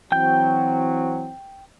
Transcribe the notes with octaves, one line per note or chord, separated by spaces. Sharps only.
E3 F#3 C4 G5 G6